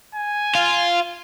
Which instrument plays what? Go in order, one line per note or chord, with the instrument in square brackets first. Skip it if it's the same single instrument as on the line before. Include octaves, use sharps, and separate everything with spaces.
[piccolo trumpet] G#5
[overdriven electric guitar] F4